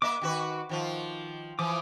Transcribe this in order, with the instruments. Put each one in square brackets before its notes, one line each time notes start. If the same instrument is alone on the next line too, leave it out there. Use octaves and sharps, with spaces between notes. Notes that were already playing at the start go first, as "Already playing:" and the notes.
[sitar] A#3 D#5 E5 [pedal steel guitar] D6
[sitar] D#3 F#4 B4
D#3 F3 F4
[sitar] E3 F3 [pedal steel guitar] D6 D#6